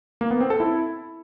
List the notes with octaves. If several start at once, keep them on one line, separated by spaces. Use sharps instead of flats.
A#3
B3
C4
A4
E4